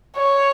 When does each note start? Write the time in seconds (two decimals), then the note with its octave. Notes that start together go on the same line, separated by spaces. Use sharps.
0.18 C#5